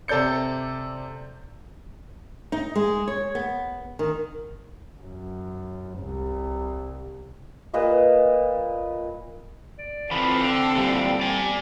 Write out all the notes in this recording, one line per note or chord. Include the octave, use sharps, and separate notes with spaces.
C3 A4 D5 G6 C#7
D#4
G#3
C#5
B3
D#3
F#2
C2
A#2 B4 D#5 F5
D5
E3 F3 C4 A4 B5
D3 G5
A#2 D3 E3 G3
D5 G#5